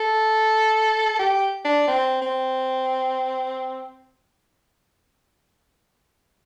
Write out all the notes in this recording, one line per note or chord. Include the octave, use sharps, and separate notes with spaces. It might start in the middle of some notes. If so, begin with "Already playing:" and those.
Already playing: A4
G4
D4
C4
C4